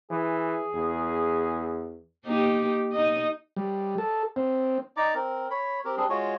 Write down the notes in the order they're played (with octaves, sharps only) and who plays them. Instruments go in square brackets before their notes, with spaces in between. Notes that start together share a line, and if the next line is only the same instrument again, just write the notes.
[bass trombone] E3 [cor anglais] G#4
[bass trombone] E2
[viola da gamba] A#3 D#4 G4
D#4 D#5
[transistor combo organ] G3
A4
C4
[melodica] D#4 D5 A#5 D6
C4 A#4
C#5 B5
C4 G4 A#4
G3 C4 D4 G#4
G#3 F4 F#4 C#5